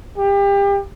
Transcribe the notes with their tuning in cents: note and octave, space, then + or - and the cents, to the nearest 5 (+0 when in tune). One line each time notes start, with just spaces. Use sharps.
G4 +30